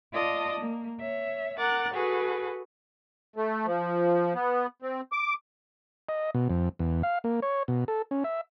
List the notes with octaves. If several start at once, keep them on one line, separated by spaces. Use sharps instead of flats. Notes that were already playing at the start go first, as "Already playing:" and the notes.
F4 D5 D#5 A5 D#6
A#3
C#5 E5
A#4 F#5 D6 F#6 A6
F#4 G#4 A4 B4
A3
F3
B3
C4
D6
D#5
B2
F2
E2
F5
A#3
C#5
B2
A4
C#4
E5